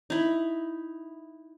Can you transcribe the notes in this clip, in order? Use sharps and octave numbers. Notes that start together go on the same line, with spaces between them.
D#4 E4